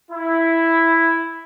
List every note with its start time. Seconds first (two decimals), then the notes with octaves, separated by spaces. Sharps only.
0.11 E4